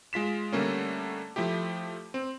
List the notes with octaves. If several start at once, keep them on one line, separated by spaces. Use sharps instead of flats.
G#3 F4 B6 E7
D3 G3 A3 A#3 C#4
F3 A3 E4 G4
C4